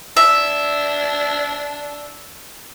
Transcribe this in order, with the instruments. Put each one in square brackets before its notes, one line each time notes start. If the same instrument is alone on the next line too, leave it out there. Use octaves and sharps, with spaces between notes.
[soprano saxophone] D4 [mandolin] E5